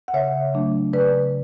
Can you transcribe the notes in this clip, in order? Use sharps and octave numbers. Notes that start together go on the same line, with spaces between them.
F#5
C#3 C#5 E5
F#3 A3 D4
C#3 B4 D5